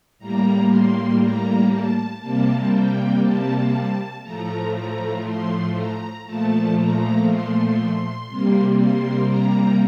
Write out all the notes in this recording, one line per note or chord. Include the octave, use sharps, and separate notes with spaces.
A2 G3 A#3 A#5
C6
A#5
A5
C3 G3 A#3 A5
G5
A5
A2 F3 A3 A#5
A#5
C6
A#5
A#2 F3 A3 A5
A#5
C6
C3 G3 A#3
C6
A#5